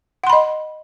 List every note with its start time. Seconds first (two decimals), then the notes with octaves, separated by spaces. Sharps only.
0.24 F#5
0.27 C6
0.30 B5
0.33 D#5